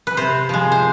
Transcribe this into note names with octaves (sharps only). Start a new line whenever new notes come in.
B4
C3 C5
F3 G#3
C5